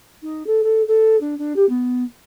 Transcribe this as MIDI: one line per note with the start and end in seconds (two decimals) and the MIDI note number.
0.22 0.46 63
0.47 0.61 69
0.63 0.82 69
0.88 1.16 69
1.21 1.35 62
1.38 1.53 62
1.56 1.67 67
1.69 2.04 59